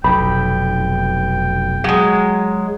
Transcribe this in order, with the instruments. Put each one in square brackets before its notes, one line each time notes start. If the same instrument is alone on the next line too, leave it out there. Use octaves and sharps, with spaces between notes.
[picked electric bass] F1 B1 [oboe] G5 [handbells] B5
[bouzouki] F#3 G#3